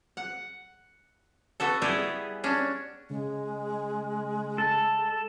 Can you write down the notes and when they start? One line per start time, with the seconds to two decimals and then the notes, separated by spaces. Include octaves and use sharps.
0.17 F#5
1.60 B3 F#4 A4
1.82 G3 B3 E4 G4 G#4
2.44 C#4 D4
3.10 C#3 G#3
4.58 A4